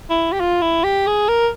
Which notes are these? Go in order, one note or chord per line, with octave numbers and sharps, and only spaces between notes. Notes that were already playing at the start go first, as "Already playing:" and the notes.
E4
G4
F4
E4
G4
G#4
A#4